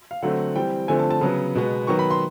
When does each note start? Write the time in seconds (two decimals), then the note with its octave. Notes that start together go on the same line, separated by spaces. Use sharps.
0.11 F5
0.22 D3 F#3 A3 C4 F#5
0.55 E3 G3 C4 G5
0.88 D3 F3 A3 C4 G#5
0.99 A5
1.11 A5
1.21 C#3 F#3 B3
1.55 B2 G#3 B3
1.87 D#3 F#3 B3 C#6
1.99 B5
2.11 C6